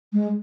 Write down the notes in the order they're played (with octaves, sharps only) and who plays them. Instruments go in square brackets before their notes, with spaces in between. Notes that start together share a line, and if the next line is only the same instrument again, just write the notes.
[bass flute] G#3